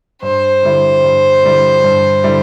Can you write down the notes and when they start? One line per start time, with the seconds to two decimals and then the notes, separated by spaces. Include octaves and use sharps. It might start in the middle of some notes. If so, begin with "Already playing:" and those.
0.22 G2 C5
0.63 D3 G3 E4
1.04 G2
1.43 D3 G3 E4
1.83 G2
2.24 D3 G3 E4